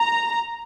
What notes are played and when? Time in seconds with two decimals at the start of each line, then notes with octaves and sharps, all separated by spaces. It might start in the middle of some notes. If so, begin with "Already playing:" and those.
Already playing: A#5